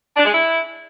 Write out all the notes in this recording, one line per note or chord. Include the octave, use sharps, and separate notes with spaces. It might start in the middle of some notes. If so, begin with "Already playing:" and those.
D4
G#3
E4